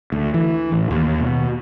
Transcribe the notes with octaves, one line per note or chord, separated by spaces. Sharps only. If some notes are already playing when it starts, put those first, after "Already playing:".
D2
E3
A1
D#2
B2